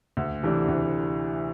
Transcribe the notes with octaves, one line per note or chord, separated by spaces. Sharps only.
D2
C3 E3 A3 D4
D2